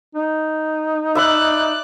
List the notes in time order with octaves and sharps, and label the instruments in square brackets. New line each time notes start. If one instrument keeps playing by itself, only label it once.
[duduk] D#4
[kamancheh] D5 F#6 [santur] E5 B5